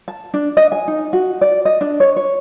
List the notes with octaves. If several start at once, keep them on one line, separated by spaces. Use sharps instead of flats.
A5
D4
D#5
G#5
D#4
F#4
D5
D#5
D4
C#5
C#5